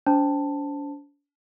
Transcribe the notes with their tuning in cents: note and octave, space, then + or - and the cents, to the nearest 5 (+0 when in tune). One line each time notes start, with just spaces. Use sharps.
D4 -45 C5 +0 A5 +5